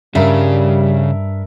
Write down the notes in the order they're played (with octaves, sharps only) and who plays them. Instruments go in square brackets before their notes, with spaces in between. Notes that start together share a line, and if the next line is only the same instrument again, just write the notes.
[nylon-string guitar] G2 [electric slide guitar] C#3 [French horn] G3 [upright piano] A#4 E5